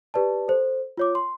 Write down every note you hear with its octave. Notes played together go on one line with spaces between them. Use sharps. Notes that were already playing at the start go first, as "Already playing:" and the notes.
G4 B4 D5 A5
A4 C5
F4 C#5 D6
C6